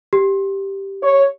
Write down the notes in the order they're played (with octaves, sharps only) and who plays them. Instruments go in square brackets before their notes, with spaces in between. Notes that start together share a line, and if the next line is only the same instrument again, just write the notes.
[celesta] G4
[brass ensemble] C#5